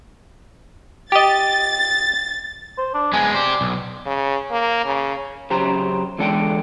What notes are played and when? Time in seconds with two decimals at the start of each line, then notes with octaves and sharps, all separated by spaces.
1.12 G4 D#5 A6
2.78 C5
2.94 D4
3.13 G#3 B3 G#5
3.35 G4 C5 D5
3.61 B1
4.06 C#3
4.51 A#3
4.85 C#3
5.50 F#2 C#3 G4 C5 A#5
6.18 E2 D3 G#3 A4 D5 G5